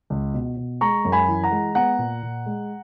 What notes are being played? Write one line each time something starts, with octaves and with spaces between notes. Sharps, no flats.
C#2
B2
B2
G#3 A#5 C#6
F#2
G#5 B5
E3
F#5 A#5
G#3
B3 F#5 A#5
A#2
A#2
G#3